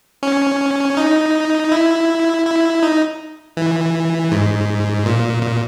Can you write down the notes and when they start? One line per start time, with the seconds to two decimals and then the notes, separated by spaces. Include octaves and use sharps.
0.23 C#4
0.97 D#4
1.72 E4
2.46 E4
2.83 D#4
3.57 E3
4.32 G#2
5.05 A#2
5.42 A#2